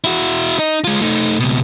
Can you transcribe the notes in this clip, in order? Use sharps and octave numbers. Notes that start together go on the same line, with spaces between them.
E4 F#4
D#4 D#5
G#3 F4
A3 D#4
C#2 B2